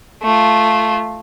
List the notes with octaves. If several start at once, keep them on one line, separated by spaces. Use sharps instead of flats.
A3 F4